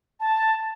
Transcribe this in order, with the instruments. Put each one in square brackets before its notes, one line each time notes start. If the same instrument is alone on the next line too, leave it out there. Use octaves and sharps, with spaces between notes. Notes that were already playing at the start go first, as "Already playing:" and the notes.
[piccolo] A5